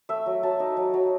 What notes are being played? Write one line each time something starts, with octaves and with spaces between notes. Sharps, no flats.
A3 E5
F#3
F#3 A5
D#4
F#3
F#3